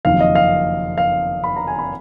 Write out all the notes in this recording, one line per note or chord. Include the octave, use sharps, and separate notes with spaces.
F#1 F2 D#3 F#3 F5
D#5
F5
F5
B5
A#5
G#5
A#5
B5